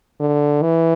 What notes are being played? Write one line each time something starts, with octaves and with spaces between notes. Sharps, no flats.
D3
E3